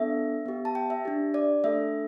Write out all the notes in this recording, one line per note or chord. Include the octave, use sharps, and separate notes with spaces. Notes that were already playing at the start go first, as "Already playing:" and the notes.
Already playing: B3 D4 A4 E5
B3 G4
A5
G5
E5
D4 G4
D5
A3 D4 A4 E5